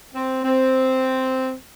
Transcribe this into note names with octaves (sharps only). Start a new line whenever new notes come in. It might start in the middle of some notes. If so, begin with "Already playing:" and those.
C4
C4